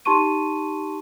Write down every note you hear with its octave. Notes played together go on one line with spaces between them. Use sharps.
D#4 G4 A5 C6 C#6 D#7